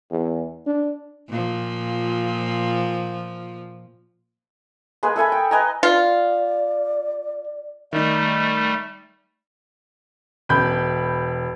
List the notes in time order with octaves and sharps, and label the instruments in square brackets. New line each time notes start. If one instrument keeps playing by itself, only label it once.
[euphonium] E2
D4
[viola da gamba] A#2 F3
[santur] G#3 A#3 G#4 B4
A4 E5 G#5 B5
G5
B4 D#5 G#5 A#5
[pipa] F4 [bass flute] D5
[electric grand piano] D#3 D#4 [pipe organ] G3 A3
[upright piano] E1 B5 G6